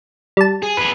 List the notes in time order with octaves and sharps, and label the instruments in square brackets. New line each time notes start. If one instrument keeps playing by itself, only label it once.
[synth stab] G3 A5
[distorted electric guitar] G#4
G#4 B4